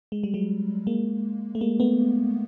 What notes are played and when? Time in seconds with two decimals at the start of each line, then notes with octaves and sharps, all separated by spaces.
0.12 G#3
0.24 G3
0.34 F#3 G#3
0.87 G#3 A#3
1.55 A3
1.61 G#3 A#3
1.80 A3 B3